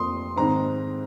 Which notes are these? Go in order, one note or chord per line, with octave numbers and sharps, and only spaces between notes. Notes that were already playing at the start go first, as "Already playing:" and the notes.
Already playing: F1 F2 F3 A#3 C6 D#6
G#2 D#3 G#3 C4 A#5